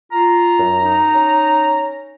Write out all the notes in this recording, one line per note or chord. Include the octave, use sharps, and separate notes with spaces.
F4 A#5
F#2
D#4
C#4